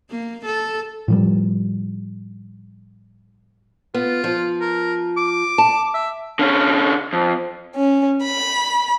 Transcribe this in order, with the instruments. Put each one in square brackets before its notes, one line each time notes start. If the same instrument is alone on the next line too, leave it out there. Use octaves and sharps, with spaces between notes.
[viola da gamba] A#3
A4
[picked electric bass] A2 F3 G3
[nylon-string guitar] B3 [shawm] F4
[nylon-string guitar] F3
[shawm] A#4
D6
[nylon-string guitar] A5
[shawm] E5
[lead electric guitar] D3 C#4
F2
[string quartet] C#4
B5